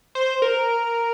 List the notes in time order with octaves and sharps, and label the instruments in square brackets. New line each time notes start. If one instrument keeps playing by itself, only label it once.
[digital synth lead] C5
A#4